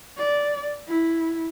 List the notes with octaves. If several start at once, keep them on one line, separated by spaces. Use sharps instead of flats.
D5
E4